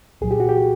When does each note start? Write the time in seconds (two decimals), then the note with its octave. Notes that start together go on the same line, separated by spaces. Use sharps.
0.21 C2 A#2 F#3 G#4
0.31 G4
0.40 F#4
0.49 G4